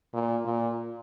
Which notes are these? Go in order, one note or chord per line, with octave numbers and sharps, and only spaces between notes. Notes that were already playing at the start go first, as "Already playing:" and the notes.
A#2
A#2